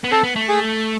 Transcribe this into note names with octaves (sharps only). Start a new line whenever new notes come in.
B3
C4 A4
B3
A3
G#4